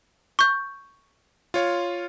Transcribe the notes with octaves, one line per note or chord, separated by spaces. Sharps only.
C#6 G6
F4 C#5 F5